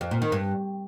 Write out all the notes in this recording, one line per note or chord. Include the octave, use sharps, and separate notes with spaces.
F2
A#2
D#3
G2